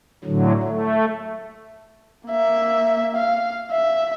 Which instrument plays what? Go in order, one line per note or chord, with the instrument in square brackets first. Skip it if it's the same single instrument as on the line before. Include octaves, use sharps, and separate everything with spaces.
[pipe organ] A2 D3 F#3
A3
[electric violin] A#3 E5
F5
E5